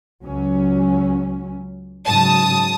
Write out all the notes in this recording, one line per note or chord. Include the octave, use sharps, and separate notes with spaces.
C#2 F#3 C#4
G#2 C#3 F#3 A5 D#6